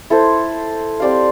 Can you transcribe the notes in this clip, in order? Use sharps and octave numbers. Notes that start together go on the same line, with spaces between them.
E4 A4 C5
C4 G4 D5 F5